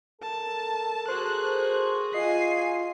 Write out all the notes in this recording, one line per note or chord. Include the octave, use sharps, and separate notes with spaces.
A4 A#4 A5
F#4 G#4 C5 F#6
F4 D#5 G#5 C7